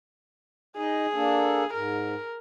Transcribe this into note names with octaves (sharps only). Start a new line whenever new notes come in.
D#4 G#4 D#5
A#3 D4 A4
G#2 A#4